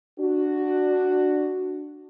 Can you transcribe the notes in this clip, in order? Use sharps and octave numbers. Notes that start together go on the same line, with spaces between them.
D4 F#4